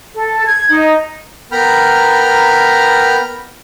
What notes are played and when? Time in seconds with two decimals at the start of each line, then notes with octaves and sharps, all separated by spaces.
0.15 A4
0.46 G#6
0.69 D#4
1.52 B3 A#4 G5 A#5 B5 F6